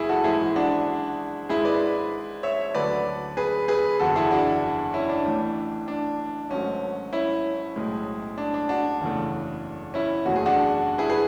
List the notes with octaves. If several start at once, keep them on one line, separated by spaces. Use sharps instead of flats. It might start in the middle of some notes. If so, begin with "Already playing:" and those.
Already playing: F#1 E2 E4 G#4
F#4 A4
G#1 G#2 E3 G#3 E4 G#4
D4 F#4
G#1 G#2 G#3 E4 G#4
B4 D5
C#5 E5
D2 D3 F#3 A3 B4 D5
G#4 B4
G#4 B4
F#1 E2 D3 F#4 A4
E4 G#4
D4 F#4
C#4 E4
D4
A1 A2 E3
D4
G#1 G#2 F#3 A3 C#4
C#4 E4
B1 A2 G#3
D4
D4
D4 F#4
F#1 E2 C#3 E3 A3
C#4 E4
F#1 E2 B2 A3 F#4
G#4
D4 F#4
E4 G#4
G#4 B4